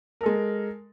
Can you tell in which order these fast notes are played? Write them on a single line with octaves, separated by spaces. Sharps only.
A#4 A4 G#3